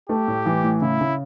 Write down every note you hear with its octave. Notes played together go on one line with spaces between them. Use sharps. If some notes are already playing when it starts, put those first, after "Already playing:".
A3 G4
A2
E3
A2
C#3 E4
C#3